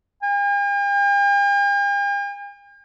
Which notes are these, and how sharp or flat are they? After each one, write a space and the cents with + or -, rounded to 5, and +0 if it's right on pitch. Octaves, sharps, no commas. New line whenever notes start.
G5 +45